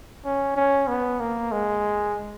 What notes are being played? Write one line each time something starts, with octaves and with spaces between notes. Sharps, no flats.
C#4
C#4
B3
A#3
G#3